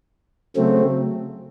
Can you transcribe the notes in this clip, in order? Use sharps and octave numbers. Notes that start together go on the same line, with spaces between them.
C#3 F#3 A3 C4